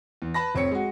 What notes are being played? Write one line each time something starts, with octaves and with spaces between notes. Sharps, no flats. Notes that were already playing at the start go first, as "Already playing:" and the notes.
E2
B4 A5 B5 A#6
F1 C4 C#5 C#7
G#3 F#4